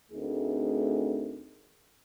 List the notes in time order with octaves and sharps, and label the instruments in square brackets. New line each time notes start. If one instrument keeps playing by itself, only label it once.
[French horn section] D2 A3 C4 D#4 G#4 A#4